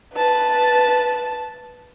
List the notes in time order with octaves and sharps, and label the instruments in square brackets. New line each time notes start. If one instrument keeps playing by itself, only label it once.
[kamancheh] B4 A5